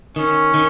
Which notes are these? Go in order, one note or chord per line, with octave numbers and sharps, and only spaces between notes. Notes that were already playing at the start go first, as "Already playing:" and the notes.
D#3 C#4
D#3